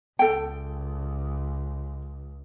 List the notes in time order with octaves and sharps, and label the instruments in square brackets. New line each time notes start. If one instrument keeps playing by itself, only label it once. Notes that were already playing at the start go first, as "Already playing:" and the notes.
[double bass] C#2 [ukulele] A4 G5